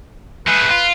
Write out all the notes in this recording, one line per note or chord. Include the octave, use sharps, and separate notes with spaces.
A3 G#4 B4
F4